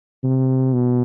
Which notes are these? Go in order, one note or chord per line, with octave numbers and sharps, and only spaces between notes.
C3
B2